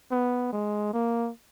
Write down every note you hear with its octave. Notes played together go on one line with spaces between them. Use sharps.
B3
G#3
A#3